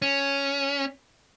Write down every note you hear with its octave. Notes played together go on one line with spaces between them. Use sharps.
C#4